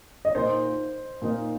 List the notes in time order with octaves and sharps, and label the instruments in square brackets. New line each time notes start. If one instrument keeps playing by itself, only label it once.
[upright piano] D#5
[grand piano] A#2 A#3 D#4 [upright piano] C5
[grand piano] A#2 A#3 D#4